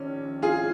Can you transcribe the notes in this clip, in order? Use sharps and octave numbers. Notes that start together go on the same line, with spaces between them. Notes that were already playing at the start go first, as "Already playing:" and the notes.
Already playing: A#1 D#3 C#4
F4 G#4